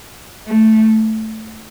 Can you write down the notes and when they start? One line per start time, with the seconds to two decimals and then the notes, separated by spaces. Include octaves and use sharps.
0.48 A3